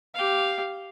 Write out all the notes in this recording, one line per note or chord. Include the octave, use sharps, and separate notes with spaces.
G4 F5